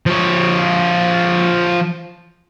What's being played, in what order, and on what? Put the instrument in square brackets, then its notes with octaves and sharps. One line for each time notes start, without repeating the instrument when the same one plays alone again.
[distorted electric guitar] F3 C#5